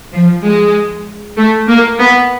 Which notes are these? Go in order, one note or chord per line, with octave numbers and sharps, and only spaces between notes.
F3
G#3
A3
A#3
B3